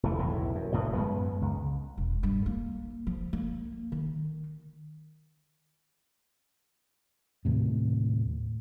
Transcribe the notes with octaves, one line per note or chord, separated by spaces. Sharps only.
F1 E2 E3 A3
B1 E2 A2 E3
F#2
F1 A2 D3 F3
F#2 G#3 B3
C#2
E1
G2
A#3
F3
A#3
D#3
D#2 A2 C3